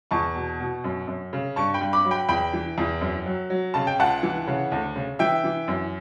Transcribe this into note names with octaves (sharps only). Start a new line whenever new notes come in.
E2 A5 C#6
B2
B2
F#2
F#2
C#3
G2 A5 C#6
G5 B5
G2
B5 D6
F#3
G5 B5
E2 G5 B5
E3
E2
F#2
F#3
F#3
C#3 A5
G5
C#2 F#5 A5
E3
C#3
D2
C#3
E3 E5 G5
E3
F#2